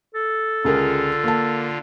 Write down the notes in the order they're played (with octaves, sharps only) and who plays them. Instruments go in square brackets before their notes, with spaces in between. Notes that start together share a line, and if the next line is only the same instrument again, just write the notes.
[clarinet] A4
[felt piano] C#2 G#4 A#4 [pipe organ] D3 F4
[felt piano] A#3 A5